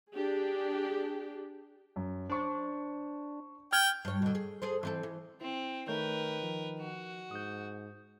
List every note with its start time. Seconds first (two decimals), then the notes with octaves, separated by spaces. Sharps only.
0.12 D4 G4 G#4
1.96 F#2
2.30 D4 C5 C#6
3.73 G5 F6 G#6
4.05 G2 C#5
4.22 B2 D3
4.35 G#4
4.62 G#4 A4 C5
4.83 E3 C4 A4
5.03 E3
5.41 C4 E4
5.88 D#3 A3 A#4 B4 C#5 G6
6.43 F3
6.79 F#4
7.31 G#2 D#6 G6